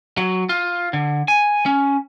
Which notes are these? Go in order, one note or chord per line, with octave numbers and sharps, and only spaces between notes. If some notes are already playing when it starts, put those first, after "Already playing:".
F#3
F4
D3
G#5
C#4